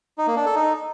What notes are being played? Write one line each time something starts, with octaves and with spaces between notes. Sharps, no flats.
D#4
A#3
D4
A4
D#4